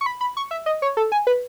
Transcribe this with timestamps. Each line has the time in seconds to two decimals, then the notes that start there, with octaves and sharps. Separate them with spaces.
0.01 C#6
0.06 B5
0.21 B5
0.37 C#6
0.51 E5
0.66 D#5
0.82 C#5
0.97 A4
1.12 G#5
1.27 B4